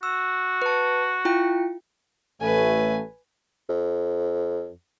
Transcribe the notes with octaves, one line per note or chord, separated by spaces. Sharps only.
F#4 E6
B4 A5
E4 F4 G5
A1 A3 B4 G#5
F2